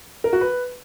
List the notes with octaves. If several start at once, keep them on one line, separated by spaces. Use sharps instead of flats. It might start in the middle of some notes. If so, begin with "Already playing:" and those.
A#4
F#4
B4